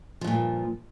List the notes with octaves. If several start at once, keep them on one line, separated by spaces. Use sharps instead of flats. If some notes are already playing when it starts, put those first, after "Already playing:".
G2 A#2 F3